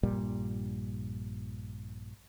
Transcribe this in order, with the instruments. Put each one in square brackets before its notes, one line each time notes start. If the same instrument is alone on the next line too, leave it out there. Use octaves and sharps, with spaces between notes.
[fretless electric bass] A#1 G2 A#2 G3